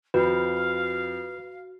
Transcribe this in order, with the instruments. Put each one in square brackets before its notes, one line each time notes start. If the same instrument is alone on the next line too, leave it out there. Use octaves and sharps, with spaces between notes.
[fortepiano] F2 [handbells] F#4 [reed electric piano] B4 [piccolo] F5